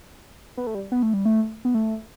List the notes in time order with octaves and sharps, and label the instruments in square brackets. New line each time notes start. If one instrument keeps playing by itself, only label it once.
[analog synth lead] B3
A3
G3
B3
A3
G3
A3
B3
A3